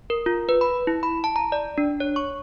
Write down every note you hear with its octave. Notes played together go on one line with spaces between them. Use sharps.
A#4
F4
B4
B5
E4
B5
A5
A#5
D5
D4
C#5
C#6